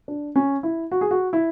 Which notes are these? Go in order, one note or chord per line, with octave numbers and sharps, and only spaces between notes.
D4
C#4
E4
F#4
G#4
F#4
E4